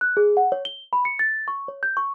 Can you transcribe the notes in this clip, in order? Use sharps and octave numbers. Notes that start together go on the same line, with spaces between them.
F#6
G#4
F#5
C#5
G7
B5
C#7
A6
C#6
C#5
G6
C#6